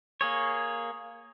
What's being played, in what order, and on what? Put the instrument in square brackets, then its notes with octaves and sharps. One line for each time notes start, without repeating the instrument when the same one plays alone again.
[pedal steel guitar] A#3 G#4 C#5